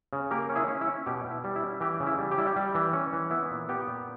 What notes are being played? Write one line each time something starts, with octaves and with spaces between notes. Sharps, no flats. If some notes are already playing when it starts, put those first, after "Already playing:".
C#3
A#3 G4 A#4
C#4
E4 G#4
C#4
E4
C#4
B2 G4
B2
E4
G3
E4
C#4
E3 G4
C#3
E4
G3
G4
G3 E4
G4
G3
E3
C#4
E3
B3 E4
A#2
B3 G4
A#2